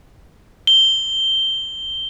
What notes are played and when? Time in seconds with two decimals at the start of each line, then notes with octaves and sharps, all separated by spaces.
0.67 G7